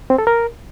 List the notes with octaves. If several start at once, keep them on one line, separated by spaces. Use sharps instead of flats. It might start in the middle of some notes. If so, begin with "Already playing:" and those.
C4
A4
A#4